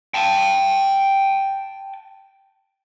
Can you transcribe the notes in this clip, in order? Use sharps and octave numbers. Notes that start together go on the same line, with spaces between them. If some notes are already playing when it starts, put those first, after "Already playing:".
G5 A5